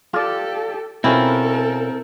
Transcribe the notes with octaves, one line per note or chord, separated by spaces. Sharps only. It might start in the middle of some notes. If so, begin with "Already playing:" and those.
F4 G4 A4 D5
B2 C4 C#4 E4 F4 A4 A#4